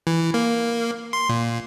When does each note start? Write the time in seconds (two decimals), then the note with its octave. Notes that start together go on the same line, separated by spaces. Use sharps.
0.07 E3
0.34 A#3
1.13 C6
1.29 A#2